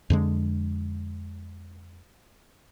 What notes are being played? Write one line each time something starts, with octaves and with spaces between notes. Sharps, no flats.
F2 D3 G#3